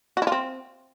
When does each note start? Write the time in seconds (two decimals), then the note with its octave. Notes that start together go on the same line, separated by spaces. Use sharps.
0.17 F#4
0.22 E4
0.27 F4
0.32 C4